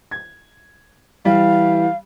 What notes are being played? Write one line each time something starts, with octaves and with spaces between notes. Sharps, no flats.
G#6
E3 G3 F5